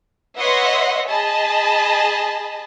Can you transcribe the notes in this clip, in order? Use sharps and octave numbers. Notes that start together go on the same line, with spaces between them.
B4 C#5 D#5 E5 F#5 C6
G#4 D#5 A5 B5